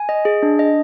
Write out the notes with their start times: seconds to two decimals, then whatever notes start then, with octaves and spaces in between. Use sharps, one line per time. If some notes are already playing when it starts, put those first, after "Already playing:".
Already playing: G#5
0.09 D#5
0.25 G#4
0.43 D4
0.59 D#5